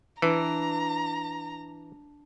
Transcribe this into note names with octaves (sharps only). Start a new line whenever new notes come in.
E3 D4 A#5